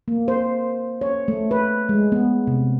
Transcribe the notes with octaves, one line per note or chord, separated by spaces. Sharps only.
A#3
C5
C#5
A3
B4
G#3
B3
C3